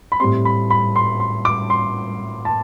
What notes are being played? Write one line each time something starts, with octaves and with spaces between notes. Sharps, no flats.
B5
A2 G3 C4 C6
B5
B5
C6
C6
D6
C6
A5